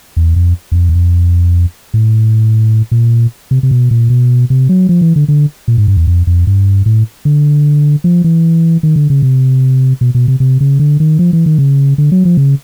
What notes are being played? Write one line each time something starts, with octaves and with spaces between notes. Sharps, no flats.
E2
F2
E2
F2
E2
F2
A2
A#2
C3
C3
B2
A#2
B2
C3
F#3
F3
E3
D3
D3
A#2
G#2
G2
E2
F2
F2
G2
A2
D3
F3
E3
D#3
D3
C#3
C3
B2
B2
C3
C3
C#3
D3
D#3
F3
E3
D#3
C#3
D3
F#3
F3
C#3